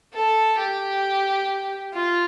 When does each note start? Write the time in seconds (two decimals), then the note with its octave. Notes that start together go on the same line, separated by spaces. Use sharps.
0.13 A4
0.58 G4
1.93 F4